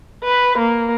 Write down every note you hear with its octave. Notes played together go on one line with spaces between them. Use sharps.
B4
A#3